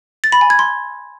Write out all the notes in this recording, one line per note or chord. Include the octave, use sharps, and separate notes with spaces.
A6
B5
G#5
G#6
C6